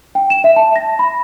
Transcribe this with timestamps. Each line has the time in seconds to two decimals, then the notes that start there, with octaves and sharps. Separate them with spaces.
0.15 G5
0.30 E7
0.44 E5
0.56 A5
0.76 A#6
0.99 B5